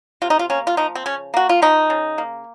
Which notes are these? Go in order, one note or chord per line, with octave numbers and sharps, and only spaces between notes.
C3 F4
D#4
F4
A#3 C#4
F4
F3 D#4
C4
C#3 C#4
A#3 F#4
F4
F3 D#4
C#3
A#3